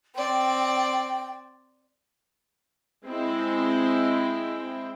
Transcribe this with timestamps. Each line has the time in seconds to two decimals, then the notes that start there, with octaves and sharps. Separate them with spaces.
0.15 C4 D5 G5
3.06 G#3 C4 E4 G5